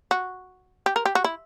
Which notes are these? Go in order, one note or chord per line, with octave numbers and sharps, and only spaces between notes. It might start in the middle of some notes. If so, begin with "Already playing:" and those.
F#4
G4
A#4
G4
F#4
E4